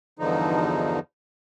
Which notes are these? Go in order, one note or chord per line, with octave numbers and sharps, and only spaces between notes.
E2 G2 D3 F3 D#4